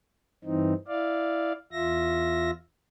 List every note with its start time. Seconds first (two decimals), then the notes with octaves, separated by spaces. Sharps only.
0.44 G2 E3 C4 D#4
0.88 E4 D5 F5
1.72 E2 F4 E5 A#6